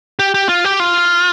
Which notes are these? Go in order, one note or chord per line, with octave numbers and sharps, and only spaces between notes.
G4
G4
F4
G4
F4